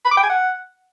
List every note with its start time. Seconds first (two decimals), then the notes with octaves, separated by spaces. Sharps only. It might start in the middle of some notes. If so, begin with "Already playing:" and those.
0.05 B5
0.11 D6
0.17 G5
0.23 G#5
0.29 F#5